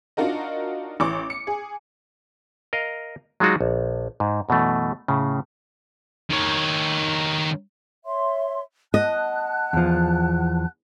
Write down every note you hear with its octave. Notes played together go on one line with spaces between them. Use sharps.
D4 D#4 F4 F#4 A#4 D#5
A1 E3 C#6 D6
C#7
G#4
A#4 D#5 F5
F#3 G#3 D#4 F4 F#4
A#1
G#2
F#2 B2 E3 A3
A2 C#3
D#3 C#5
C#5 E5 C6
D#5 F#5 A5 F#6
E2 F3